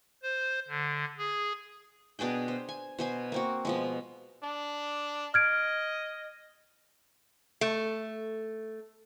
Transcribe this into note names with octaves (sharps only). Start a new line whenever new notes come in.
C5
D3
G#4
B2 D4 G#4 G5
C5
G#5
B2 C5 G#5
A#3 C4 F#4
B2 F3 G#3
D4
D#5 F6 G#6 D7
A3